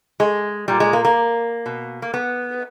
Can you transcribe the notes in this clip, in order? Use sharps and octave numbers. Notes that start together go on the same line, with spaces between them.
G#3
A#2 G3
G#3
A#3
A#3
B2
A#3
B3